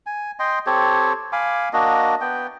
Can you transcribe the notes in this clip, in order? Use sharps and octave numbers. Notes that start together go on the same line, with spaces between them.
G#5
D#5 G5 C6
C4 G4 A4 C#5
F5 G#5 B5 D6
A#3 D4 F#4 D#5
B3 G5